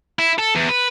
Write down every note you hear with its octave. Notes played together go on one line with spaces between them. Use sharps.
E4
A4
E2
B4